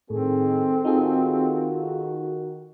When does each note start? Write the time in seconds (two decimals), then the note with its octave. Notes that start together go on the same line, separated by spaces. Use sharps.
0.10 A2 D#3 C4 G#4 A4
0.85 D#3 D#4 F4 F#4 G#4 A4